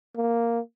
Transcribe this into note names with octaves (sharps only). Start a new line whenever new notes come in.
A#3